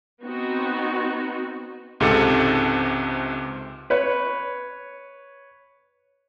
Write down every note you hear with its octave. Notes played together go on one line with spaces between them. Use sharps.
B3 C4 D#4 F#4
C#2 G#2 C3 A4 A5 C#7
B4 C#5